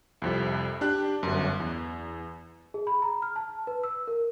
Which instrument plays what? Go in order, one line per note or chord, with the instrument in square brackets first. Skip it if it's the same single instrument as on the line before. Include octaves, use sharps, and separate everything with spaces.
[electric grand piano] C2 F2 C3
D4 G4 F#6
G1 F#2
E2
[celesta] G#4
B5
A#5
F6
A5
B4
E6
A#4